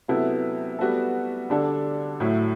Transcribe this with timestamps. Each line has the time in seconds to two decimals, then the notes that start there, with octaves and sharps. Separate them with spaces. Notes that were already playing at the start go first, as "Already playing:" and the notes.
0.08 C3 F#3 B3 E4 A4
0.79 G3 B3 F#4 A4
1.50 D3 G3 D4 A4
2.20 A2 F#3 A3 E4